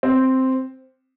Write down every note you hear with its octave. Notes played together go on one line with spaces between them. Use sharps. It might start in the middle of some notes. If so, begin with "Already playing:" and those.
C4